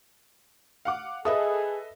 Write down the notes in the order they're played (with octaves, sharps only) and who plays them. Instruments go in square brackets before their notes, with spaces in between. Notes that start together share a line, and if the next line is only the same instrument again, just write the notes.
[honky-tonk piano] F5 F#5 D6
[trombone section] G#4 [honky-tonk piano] A4 B4 [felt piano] D#5 E5 D#6